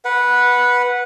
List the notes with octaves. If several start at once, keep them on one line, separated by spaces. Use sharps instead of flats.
B4 F#5